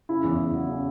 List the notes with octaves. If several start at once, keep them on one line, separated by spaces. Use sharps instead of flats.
C#3 E4
E2
E2
F#3
C#3